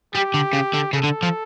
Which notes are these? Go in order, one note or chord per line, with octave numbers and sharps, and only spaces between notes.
G3 G4
D3
C#3
D3
C#3 A4
D3
F3